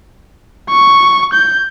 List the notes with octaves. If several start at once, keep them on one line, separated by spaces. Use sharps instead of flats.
C#6
G6